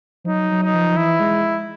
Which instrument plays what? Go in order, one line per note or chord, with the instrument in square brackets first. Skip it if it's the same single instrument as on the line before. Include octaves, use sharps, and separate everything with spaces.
[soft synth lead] F3
[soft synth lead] F#3 [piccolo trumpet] D#4
[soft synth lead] F#3
[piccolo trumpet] D#4
[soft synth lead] F3
[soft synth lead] E3 [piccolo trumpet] E4
[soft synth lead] G#3